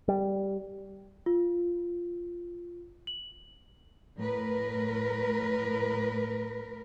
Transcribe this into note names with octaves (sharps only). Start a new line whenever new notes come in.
G3
F4
F#7
A2 A#4 B4